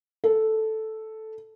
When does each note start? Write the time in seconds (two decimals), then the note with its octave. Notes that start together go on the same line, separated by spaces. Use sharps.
0.24 A4